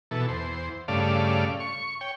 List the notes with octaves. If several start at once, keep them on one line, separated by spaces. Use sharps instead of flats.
B2 E3 A4
E2 C5
G2 C#3 A3 D5 F5
C#6
C#5 G5